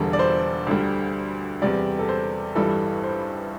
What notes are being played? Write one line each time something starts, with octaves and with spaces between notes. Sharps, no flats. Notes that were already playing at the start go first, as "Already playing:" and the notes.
Already playing: E1 E2 D3 G3 A4
D5
C5
D2 D3 G3
E2 C3 G3 D5
A4
C5
A1 G2 E3 G3 A4
C5